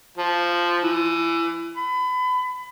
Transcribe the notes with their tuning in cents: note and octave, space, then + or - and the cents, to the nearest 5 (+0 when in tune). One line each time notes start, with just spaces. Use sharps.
F3 -5
E3 +25
B5 +30